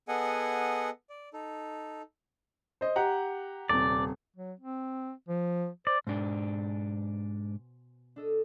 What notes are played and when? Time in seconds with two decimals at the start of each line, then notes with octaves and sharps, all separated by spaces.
0.08 B3 G#4 A4 D#5 F#5 G#5
1.10 D5
1.33 D#4 A4
2.81 C5 D#5
2.96 G4 F#5 A#5
3.69 D#1 C3 D5
4.36 F#3
4.59 C4
5.28 F3
5.87 C5 D5
6.07 G#2 B2 D4 C5 G#5
8.16 D4 A4 D#5